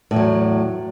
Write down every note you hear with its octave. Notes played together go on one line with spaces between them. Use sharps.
E2 A2 F#3